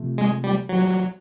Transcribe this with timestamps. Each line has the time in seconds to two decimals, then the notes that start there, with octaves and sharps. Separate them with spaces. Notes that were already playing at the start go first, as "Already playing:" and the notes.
Already playing: C3 F3 A3
0.18 G#3
0.44 G3
0.69 F#3